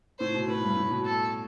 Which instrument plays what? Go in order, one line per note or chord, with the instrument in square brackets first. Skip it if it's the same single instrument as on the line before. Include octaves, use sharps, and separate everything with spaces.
[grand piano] A2 [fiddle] C5
[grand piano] B2
[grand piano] A2 [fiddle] B4
[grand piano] G2
A2
B2
[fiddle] A4